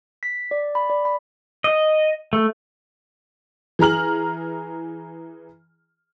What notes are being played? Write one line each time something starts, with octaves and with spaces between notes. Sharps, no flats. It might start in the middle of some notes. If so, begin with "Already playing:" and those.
B6
D5
B5
D5
B5
D#5
A3
E3 G#4 A#5 F6 F#7